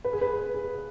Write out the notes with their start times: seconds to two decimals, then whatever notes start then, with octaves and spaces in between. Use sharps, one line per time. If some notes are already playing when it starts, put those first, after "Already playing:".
0.04 B4
0.13 G#4
0.21 B4
0.54 G#4